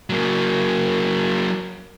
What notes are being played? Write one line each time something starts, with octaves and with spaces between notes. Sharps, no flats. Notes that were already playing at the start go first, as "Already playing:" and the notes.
F#3 A#3